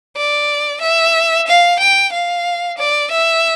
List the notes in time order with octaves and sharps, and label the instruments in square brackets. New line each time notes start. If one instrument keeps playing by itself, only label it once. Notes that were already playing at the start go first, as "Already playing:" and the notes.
[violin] D5
E5
F5
G5
F5
D5
E5